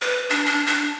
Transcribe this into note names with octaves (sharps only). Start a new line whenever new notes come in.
B4
D4
D4
D4